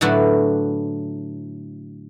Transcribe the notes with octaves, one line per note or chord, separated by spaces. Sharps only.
A2 D3 F#3 E4 F#4 B4